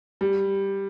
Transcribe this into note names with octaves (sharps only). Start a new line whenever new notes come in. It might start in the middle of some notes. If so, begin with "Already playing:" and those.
G3